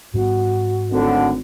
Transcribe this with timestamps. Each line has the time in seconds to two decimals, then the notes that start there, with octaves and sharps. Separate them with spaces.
0.14 G#2 G3 B3 F#4
0.91 G#1 D2 A2 D3